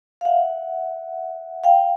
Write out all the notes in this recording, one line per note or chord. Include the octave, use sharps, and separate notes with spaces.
F5
E5 F#5
F5 G5